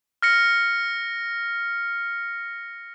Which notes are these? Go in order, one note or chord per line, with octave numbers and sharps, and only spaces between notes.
F6 A#6 C#7